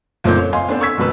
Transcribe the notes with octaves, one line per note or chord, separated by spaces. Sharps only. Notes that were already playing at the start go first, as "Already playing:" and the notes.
F#1 A#2 C4 D#4 A4 G6
C#5
D#5 F5 G#5 C6
B3 C4 D4 A4 C5
C#6 E6 G#6 B6
E1 B2 B4 E6